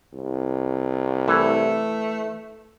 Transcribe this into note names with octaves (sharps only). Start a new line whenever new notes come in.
C2
E3 A3